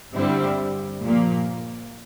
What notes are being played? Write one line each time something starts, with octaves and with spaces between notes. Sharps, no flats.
G2 D3 G3 C4 E4
A#2 F3 A#3